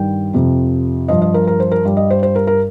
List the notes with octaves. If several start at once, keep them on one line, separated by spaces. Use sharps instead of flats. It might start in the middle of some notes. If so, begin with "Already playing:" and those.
Already playing: G2 D#3 G3 G5
F2 C3 F3
G2 F3 D#5
D#5
A#4
A#4
C5
A#4
G2 G3
D#5
C5
C5
A#4
A#4